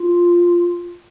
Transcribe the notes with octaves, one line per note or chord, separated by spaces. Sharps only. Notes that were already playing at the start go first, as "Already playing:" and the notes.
Already playing: F4